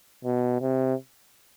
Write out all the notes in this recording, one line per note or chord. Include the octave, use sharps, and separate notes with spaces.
B2
C3